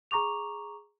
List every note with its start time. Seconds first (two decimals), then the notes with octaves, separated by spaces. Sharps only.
0.11 G#4 A#5 C#6 D6 F7